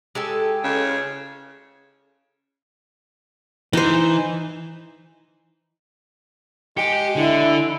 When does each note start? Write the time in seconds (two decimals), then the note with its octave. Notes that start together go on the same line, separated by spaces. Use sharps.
0.15 G#3 G4 A4
0.64 C#3
3.73 E3 D#4 C5
6.77 G#3 G4 G5 C#7 D7
7.16 D3 E4